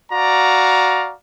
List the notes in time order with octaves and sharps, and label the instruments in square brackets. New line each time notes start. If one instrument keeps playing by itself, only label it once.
[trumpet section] F#4 D5 F5 A#5